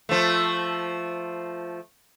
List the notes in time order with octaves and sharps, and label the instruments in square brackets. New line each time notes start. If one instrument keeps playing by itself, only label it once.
[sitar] F3 A3